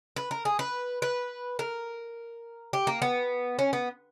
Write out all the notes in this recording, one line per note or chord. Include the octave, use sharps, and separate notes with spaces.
B4
A#4
G#4
B4
B4
A#4
G4
A#3
B3
C#4
B3